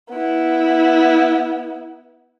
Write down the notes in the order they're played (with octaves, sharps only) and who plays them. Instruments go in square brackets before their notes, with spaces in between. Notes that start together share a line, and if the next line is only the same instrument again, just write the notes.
[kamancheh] B3 E4